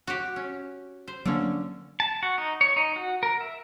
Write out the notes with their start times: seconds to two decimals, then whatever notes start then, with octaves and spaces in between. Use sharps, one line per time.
0.07 F#4 G4
0.36 C#4
1.08 C5
1.25 D3 F#3 A#3 C#4
2.00 A5
2.23 F#4
2.38 D#4
2.61 C#5
2.76 D#4
2.96 F#4
3.23 A#4
3.41 E5